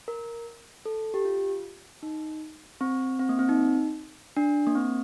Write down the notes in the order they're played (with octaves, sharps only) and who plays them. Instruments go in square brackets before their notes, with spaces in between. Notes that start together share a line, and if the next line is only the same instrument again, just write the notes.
[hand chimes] A#4
A4
G4
F4
D#4
C4
C4
A#3
C4
D#4
D4
A#3
C4